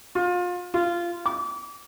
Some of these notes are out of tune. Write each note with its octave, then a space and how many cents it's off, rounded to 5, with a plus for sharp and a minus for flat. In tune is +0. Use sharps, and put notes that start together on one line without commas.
F4 +30
F4 -15
D6 -30